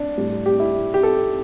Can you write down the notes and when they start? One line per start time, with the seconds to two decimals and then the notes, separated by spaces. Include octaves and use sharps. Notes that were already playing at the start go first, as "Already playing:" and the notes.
Already playing: D4
0.17 A2 G3
0.46 G4
0.60 E4
0.94 G4
1.03 A4